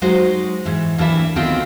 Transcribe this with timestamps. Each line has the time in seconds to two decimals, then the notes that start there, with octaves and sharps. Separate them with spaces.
0.02 F#3 G#3 D#4 F#4 C5
0.65 G#2 E3
0.98 D#2 E3 D4 B4 E5
1.36 D2 D#3 B3 C4 F4 G5